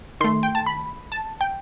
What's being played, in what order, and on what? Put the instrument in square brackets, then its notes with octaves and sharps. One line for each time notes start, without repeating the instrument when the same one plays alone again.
[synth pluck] D#3 A3 C6
G5
A5
B5
A5
G5